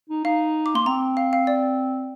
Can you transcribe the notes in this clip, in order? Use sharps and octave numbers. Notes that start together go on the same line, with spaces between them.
D#4
D#4 F5
D6
A#3 C6
C4 A#5
F5
F5
D5